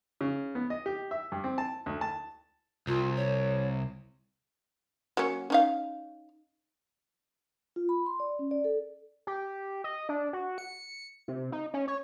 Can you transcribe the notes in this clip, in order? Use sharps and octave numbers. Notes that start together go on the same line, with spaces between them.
C#3
B3
D#5
G4
E5
G2
C4
A5
D2
A5
C2 F4
C#5
F#3 A#3 C#4
C#4 D#4 F5
F4
B5
C6
D5
C#4
D5
A4
G4
D#5
D4
F#4
C#7
C3
D#4
C#4
C#5